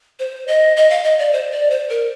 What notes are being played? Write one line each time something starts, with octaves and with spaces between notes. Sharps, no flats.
C5
D#5
D#5
F5
D#5
D5
C5
D5
C5
A#4